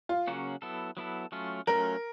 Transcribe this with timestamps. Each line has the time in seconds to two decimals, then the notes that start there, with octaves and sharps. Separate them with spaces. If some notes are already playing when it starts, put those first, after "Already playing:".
0.09 F4
0.27 C#3 F#3 A#3 C#4 F#4
0.62 F#3 B3 E4 A4
0.97 F#3 B3 E4 A4
1.32 F#3 A3 C#4 F4
1.67 F#3 A3 C#4 F4 A#4